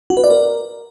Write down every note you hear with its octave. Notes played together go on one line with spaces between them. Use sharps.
F#4
B4
D5
A#4